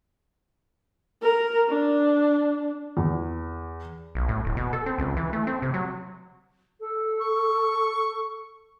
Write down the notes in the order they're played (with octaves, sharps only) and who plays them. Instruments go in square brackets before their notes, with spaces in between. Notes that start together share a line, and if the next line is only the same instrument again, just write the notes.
[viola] A#4
D4
[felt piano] E2
[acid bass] B1
A2
D1
B2
A4
C4
C#2
E3
A3
C4
C3
F#3
[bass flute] A4
[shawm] C#6